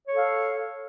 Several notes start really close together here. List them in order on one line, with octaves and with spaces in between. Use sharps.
C#5 A4 F5